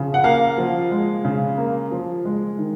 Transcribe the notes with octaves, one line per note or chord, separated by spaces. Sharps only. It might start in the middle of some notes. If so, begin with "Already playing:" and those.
Already playing: C#3 F3
F#5
A#3 F5
F3
G#3
C#3
A#3
F3
G#3
D#3